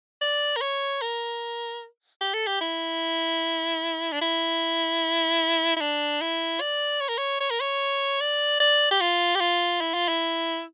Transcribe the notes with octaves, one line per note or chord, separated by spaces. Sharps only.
D5
A#4
C#5
A#4
G4
A4
G4
E4
D4
E4
E4
D4
E4
D5
C#5
A#4
C#5
C#5
A#4
C#5
D5
D5
G4
F4
G4
F4
E4
F4
E4